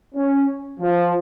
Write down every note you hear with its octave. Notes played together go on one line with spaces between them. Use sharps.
C#4
F3